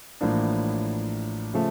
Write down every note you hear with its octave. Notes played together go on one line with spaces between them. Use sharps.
A1 A2 F3 A#3 D4
C#3 F3 A3